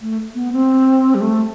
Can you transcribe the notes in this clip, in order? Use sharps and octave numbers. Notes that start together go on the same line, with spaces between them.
A3
B3
C4
G3
A3